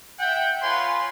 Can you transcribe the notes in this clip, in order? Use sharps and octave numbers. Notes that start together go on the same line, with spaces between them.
E5 F#5 G5
F4 B4 C#5 G#5 C6